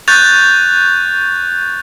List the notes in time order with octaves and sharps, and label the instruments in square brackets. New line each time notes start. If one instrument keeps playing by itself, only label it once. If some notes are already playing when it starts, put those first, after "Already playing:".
[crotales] C#6 F#6 G6 A6 F7